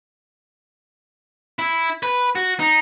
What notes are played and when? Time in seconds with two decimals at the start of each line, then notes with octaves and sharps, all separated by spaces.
1.59 E4
2.03 B4
2.35 F#4
2.59 D#4